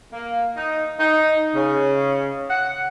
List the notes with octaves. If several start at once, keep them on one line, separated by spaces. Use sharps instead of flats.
A#3
D#4
D#4
C#3
F#5